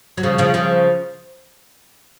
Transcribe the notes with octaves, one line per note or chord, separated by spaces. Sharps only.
F#3
C#3 F3
C#3 F3
C#3 F3